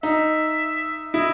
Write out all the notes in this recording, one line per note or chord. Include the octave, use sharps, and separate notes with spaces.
D#4 E5
E4 D#5